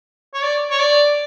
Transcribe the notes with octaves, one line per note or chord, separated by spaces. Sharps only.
C#5
D5
C#5
D5